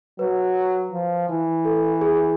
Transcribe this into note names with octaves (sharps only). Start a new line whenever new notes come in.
F#3 B4
F3
E3
A4
G#4